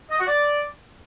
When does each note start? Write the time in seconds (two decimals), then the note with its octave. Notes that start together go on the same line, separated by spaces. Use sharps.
0.11 D#5
0.19 F#4
0.28 D5